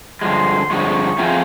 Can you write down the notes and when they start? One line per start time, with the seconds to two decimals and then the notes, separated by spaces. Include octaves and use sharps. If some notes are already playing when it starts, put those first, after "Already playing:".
0.21 G2 D3 F3 G#3 C6
0.70 G2 D3 F3 G#3 C#6
1.19 F3 A3 C4 F4 G#4